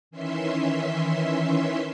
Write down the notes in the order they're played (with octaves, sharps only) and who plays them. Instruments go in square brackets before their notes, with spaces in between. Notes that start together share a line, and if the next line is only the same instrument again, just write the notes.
[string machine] D#3 E3 C#4 E5 C6